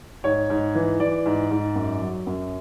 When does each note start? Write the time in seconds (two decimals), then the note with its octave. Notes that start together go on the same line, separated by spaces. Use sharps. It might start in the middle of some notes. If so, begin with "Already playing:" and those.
0.24 G#2 C#5
0.50 G#2
0.75 E3
0.99 E3 D5
1.26 G#2
1.51 G#2
1.76 F#2
2.01 F#3
2.27 F#2